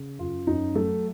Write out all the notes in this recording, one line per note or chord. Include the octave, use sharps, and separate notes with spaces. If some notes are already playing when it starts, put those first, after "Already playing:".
Already playing: C#3
F#2 F4
F#2 D#4
F#3 A3